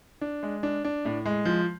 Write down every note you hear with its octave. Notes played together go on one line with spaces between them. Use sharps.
D4
G#3
D4
D4
A2
G#3
F3